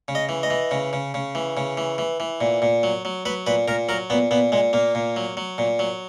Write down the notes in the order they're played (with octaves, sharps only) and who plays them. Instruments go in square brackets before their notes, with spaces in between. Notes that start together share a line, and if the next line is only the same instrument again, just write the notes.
[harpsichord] C#3
D#5
E3
D#5
E3
C#3
C#3
C#3
E3
C#3
E3
E3
E3
A#2
A#2
F#3
F#3
F#3 B4
A#2 B4
A#2 A#4
F#3 A#4
A#2 B3
A#2 B3
A#2 G#3
A#2 A#3
A#2
F#3
F#3
A#2
F#3